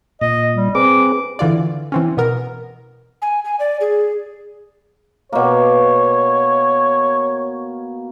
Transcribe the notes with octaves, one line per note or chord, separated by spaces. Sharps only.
A#2 D#5
G3
C4 G#4 B4 D6
D3 E3 F4 D5
E3 C4 C#4
B2 B3 A#4
G#5
G#5
D5
G#4
B2 A#3 C#5